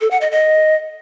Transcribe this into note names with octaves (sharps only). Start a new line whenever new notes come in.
A4
F#5
D#5
D#5